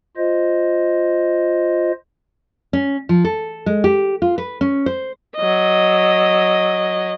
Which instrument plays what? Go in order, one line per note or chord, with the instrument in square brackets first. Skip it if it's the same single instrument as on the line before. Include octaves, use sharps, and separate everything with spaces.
[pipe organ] F4 C5 D#5
[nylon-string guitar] C#4
F3
A4
G#3
G4
F4
B4
C#4
C5
[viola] F#3 D#5